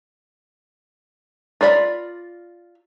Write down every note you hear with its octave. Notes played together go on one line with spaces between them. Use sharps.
F4 A#4 D5 B5